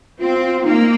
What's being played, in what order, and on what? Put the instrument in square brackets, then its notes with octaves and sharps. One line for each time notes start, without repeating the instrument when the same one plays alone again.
[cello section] C4 [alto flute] F4
[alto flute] F4
[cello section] A#3 [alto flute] D#4